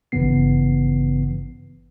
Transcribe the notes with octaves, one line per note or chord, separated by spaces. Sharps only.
G#1 G2 C#3 E3 B3 C7